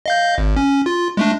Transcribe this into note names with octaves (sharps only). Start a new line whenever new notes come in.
D#5 F5 G6
G#1
C#4
F4
G#3 A3 D4